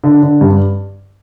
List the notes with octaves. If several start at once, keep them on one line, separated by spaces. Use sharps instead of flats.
D3
D3
G2